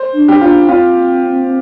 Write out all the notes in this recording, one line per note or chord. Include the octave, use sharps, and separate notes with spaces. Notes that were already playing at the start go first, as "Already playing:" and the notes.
Already playing: C5
D4
G4
D4 F4
C4 F4